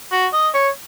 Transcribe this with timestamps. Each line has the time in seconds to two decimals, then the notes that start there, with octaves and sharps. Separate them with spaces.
0.12 F#4
0.33 D#5
0.54 C#5